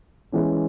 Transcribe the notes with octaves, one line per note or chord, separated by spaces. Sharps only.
E3 G#3 C#4